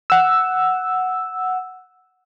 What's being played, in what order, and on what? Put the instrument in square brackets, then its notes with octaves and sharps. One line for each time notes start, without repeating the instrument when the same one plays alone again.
[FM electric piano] F#5 E6